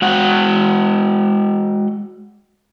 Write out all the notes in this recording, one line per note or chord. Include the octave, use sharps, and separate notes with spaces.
G#3 F#4 F#5 G5